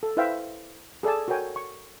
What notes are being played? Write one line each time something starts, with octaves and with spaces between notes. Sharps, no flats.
A4
E4 B4 C5 E5 F5 G5
G#4 A4 D5 G#5 A5
F#4 A4 A#4 C#5 G5 G#5
C#6